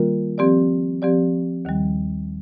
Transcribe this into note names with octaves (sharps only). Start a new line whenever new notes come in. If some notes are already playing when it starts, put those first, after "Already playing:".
Already playing: D#3 G3 A#3 F4 A#4
F3 C4 G4 D5
F3 C4 G4 D5
D#2 D#3 G3